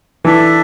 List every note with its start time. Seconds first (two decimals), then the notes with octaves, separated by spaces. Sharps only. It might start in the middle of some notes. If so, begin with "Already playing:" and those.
0.25 E3 D4 A4 E5